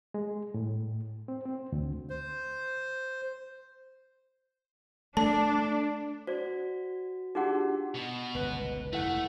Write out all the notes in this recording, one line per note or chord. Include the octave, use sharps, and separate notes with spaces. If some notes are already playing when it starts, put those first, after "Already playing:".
G#3
A2
C4
C4
D2
C5
A3 D4 A5
F#4 C5 D5
D4 D#4 F4 G4 G#4 F#5
B2
G1 C#2 B4
F1 D#2 A3 E4 F#5